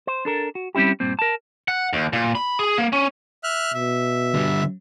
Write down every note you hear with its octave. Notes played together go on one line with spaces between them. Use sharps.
C5
D4 A4 A#4
F#4
G3 C4 C#4 E4 G4
G2 A#2 C4
A#4 A5
F#5
D#2
A#2
B5
G#4
A#3
C#4
E5 F6 F#6
B2 E5
D3 G3